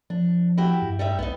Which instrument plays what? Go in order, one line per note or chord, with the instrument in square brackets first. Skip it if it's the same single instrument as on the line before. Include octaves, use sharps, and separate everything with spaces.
[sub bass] F3 [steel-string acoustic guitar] D4
[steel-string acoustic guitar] E4 F#4 G4
[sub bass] G2
[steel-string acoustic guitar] G3 D#4 E5
[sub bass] B1 [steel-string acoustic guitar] B3 D#4